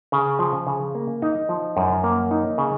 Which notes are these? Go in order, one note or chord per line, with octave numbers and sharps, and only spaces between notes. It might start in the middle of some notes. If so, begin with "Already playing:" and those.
C#3
F3
C#3
A#3
D#4
F3
F#2
A#3
D#4
C#3